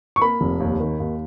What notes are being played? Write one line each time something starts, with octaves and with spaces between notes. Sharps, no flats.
C#6
A#3 B5
F1
D#2
D#3
D#2